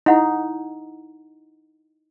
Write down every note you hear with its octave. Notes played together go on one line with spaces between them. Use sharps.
D#4 E4 F#5